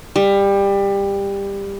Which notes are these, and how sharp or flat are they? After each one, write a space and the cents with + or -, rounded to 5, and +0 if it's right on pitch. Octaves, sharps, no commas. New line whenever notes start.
G3 +20